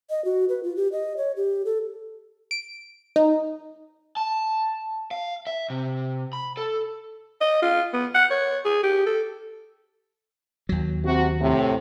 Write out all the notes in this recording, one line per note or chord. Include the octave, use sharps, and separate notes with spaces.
D#5
F#4
B4
F4
G4
D#5
C#5
G4
A4
D7
D#4
A5
F5
E5
C3
B5
A4
D#5
F4
B3
F#5
C#5
G#4
G4
A4
D#2 F#3
C3 F#4
A2 C3